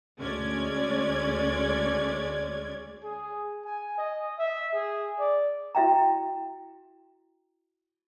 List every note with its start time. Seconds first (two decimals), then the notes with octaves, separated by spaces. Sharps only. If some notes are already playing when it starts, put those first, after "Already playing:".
0.19 D2 G#3 C#4 D5 G#6
3.04 G#4
3.64 G#5
3.98 D#5
4.38 E5
4.74 G#4
5.19 D5
5.75 E4 F#4 E5 G5 A#5